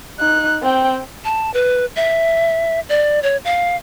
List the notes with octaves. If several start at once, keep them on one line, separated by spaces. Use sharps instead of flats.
D#4 F#6
C4 G5
A5
B4
E5
D5
C#5
F5